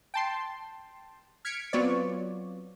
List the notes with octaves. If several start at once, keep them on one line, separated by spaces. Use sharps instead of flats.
G5 A5 C6
F6 G#6 B6 C#7 D7
F#3 B3 C4 F4 C#5 D5